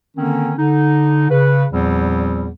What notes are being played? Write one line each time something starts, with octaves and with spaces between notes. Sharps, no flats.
D3 D#3 A#3 C4 C#4
D3 D#4
C#3 B4
E2 A#2 F3 G3 B3 C4